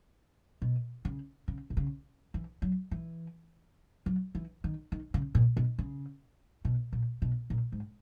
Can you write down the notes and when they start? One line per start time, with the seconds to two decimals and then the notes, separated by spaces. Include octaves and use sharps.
0.62 B2
1.05 C#3
1.48 C#3
1.70 B2
1.77 C#3
2.34 E3
2.62 F#3
2.91 E3
4.06 F#3
4.35 E3
4.64 D#3
4.92 D#3
5.14 C#3
5.35 A#2
5.57 B2
5.79 C#3
6.65 B2
6.93 A#2
7.22 B2
7.50 A#2
7.72 G#2